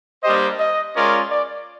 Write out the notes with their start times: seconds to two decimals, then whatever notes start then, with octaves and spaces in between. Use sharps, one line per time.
0.23 G3 A#3 D4 G4 C5 D#5
0.59 D#5
0.95 G#3 C#4 F4 A#4 D5
1.31 D5